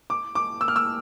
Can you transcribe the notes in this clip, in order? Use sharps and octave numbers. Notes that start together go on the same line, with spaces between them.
D6
D6
E6
F6
E6